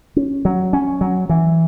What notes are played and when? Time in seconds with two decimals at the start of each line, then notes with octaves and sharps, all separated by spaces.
0.16 C#4
0.45 F#3
0.73 C#4
1.01 F#3
1.29 E3